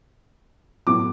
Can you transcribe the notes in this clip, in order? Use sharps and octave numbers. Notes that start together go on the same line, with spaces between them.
A2 F#3 B3 D6